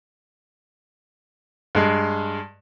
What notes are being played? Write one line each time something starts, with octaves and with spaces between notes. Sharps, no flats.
G2 G#3